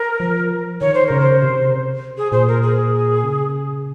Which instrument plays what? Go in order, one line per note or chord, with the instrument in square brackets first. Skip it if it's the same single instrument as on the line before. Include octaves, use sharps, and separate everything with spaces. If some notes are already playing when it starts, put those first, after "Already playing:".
Already playing: [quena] A#4
[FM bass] F3
[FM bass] D#3 [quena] C#5
[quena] C5
[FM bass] C#3 [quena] A#4
[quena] C5
[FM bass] C3
[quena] G#4
[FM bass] A#2 [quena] C5
[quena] A#4
G#4
[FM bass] C#3